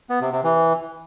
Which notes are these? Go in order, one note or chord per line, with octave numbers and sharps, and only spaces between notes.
B3
C3
C3
E3